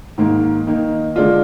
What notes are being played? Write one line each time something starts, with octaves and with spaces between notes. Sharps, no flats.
G#2 D#3 A#3
D#3 A#3 D#4
D3 G#3 D4 F4